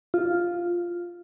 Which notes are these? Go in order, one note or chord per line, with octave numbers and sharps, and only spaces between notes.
F4